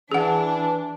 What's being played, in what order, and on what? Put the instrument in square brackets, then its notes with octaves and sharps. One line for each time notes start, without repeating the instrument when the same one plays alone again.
[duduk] E3 [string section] D4 [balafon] G#4 F#5